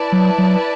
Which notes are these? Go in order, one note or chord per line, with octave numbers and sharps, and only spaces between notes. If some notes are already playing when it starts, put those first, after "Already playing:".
Already playing: E4 B4 D5 A5
F#3
F#3